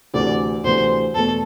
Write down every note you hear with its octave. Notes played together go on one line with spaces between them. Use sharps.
D2 C3 E3 A3 D5
D2 C3 E3 A3 C5
E2 B2 A3 A4